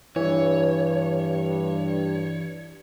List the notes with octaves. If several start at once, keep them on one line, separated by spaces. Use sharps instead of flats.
G2 E3 C#5